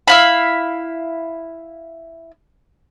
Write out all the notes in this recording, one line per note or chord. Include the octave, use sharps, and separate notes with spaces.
E4 F5 B5